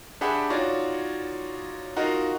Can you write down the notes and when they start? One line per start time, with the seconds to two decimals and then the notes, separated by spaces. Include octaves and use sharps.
0.21 D4 G4 G#4 E5 F#5 B5
0.50 D#4 F4 F#4 C#5 D5
1.96 D#4 F4 F#4 A#4 D#5 F5